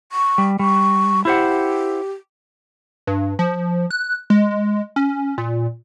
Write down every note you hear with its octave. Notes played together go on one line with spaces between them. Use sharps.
C#6
G3
G3 C#6
E4 G4 C5 F#5
G2
F3
F#6
G#3
C#4
A#2